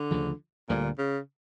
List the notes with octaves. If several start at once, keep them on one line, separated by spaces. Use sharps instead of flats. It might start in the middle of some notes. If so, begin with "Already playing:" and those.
Already playing: D3
D2 C#3 F3
D2 A#2 D3 G3
C#3